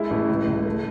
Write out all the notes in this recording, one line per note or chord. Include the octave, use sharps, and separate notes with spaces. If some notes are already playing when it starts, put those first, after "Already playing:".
Already playing: G#3 E4
A1
C#2
C#2
A3